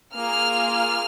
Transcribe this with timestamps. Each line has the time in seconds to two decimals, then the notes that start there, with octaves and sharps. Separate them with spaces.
0.14 A#3 F4 G#4 F6